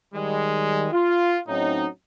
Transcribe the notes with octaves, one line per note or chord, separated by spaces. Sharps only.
D#3 G3 G#3
F4
A2 F#3 C4 C#4 D#4